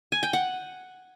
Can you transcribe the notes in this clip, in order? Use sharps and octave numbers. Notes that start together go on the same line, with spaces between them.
G#5
G5
F#5